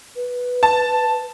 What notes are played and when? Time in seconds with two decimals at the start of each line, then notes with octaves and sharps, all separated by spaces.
0.16 B4
0.63 A5